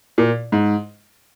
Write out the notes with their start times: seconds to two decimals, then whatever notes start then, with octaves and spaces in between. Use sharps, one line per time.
0.18 A#2
0.52 G#2